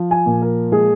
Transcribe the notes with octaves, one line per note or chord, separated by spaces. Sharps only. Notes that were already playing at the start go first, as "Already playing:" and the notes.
Already playing: F3
G#5
A#2
A#4
G#3 G#4